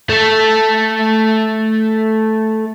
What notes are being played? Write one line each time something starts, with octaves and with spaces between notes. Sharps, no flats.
A3 A4